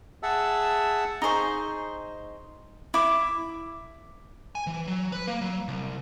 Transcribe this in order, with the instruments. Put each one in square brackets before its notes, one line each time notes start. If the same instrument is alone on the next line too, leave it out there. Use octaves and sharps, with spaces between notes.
[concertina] G#4 E5 F#5 A5 E6
[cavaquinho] D#4 G#4 C5 C#6
E4 D6
[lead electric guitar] G#5
E3
F#3
B4
A#3
F#3
C2